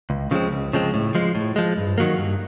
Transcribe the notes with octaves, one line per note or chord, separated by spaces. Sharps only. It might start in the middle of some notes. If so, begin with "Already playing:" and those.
C#2
C#3 F3 G#3 C4
C#2
C#3 F3 G#3 C4
A2
F3 G#3
A2
F3 G#3
G2
D#3 F#3 A#3
G2